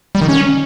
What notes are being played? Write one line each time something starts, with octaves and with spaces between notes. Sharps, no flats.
G3
D#3
C#4